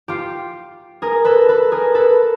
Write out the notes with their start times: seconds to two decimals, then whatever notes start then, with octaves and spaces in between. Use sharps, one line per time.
0.08 F4 G4
1.02 G#4 A#4
1.25 A4 B4
1.48 A4 B4
1.72 G#4 A#4
1.95 A4 B4